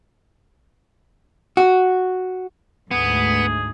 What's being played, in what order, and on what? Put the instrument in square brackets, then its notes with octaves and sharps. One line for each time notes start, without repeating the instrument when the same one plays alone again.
[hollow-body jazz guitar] F#4
[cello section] D2 G#2 [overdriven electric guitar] B3 [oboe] G#4